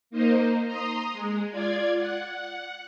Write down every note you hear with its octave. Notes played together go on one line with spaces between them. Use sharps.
A#3 D#4 C5 D#5
A#5 C6 D#6
G#3
F4 D5 G#6
F#5